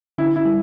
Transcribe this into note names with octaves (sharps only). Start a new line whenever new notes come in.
D3 E4
E4
G3